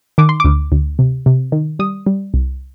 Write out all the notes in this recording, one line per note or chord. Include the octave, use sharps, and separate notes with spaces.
D#3 D6
C6
D2 D6
D2
C3
C3
D#3
G3 D#6
G3
C2